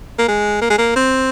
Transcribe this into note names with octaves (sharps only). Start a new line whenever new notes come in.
A#3
G#3
A#3
G#3
A#3
C4